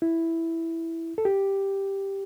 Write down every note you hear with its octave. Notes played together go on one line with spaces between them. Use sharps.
E4
A4
G4